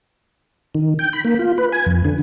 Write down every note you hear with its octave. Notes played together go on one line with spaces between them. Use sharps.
D#3
G5
B5
A#3
F4
B4
G#5
F2
D3